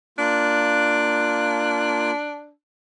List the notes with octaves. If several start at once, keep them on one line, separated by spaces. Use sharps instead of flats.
A#3 D4 F4 F#6